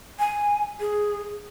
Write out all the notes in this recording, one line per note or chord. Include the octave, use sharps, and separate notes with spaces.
G#5
G#4